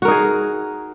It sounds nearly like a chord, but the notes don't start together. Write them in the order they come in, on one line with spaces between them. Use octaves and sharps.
F#4 A#4 D#4 G#4